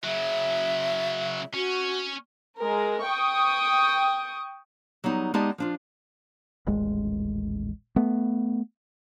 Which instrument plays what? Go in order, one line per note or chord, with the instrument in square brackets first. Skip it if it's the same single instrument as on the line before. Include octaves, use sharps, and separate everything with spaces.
[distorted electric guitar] C#3 F#3 [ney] E5
[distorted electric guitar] C#4 [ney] F#4
[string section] G#3 A#4
G5 C#6 D#6
[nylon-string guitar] F#3 G3 B3 D#4
G#3 B3 D#4 G4 D5 A5
F3 D4 F4
[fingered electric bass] D#1 A1 G#3
A3 B3